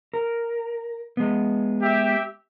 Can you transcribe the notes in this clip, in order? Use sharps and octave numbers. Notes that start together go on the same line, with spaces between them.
A#4
G#3 B3
G4 E5